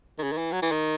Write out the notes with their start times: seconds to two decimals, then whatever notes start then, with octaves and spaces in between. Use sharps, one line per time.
0.18 D#3
0.23 C#3
0.32 D#3
0.38 E3
0.52 F#3
0.62 E3
0.72 D#3